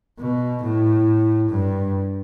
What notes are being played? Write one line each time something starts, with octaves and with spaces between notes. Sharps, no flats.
B2
A2
G2